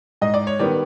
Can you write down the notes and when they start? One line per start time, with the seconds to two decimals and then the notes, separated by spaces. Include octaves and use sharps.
0.21 G#2 D#5
0.34 D5
0.47 C#5
0.59 D#3 G3 B3 D5